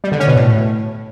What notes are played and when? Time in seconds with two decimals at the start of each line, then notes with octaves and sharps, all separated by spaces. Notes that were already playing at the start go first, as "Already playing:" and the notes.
0.04 G3
0.12 D3
0.20 C#4
0.28 B2
0.36 A2